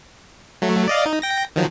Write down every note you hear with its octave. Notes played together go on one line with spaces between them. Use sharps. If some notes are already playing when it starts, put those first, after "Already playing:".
F#3 A3
D5 D#5 F5
D#4
G5 A#6
D#3 F3 F#3